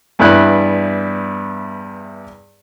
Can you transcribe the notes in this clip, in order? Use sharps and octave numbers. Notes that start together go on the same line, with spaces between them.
E2 G2 B3 E4 D5 F#6